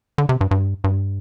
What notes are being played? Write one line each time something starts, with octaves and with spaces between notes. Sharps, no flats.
D3
C3
G2
G2
G2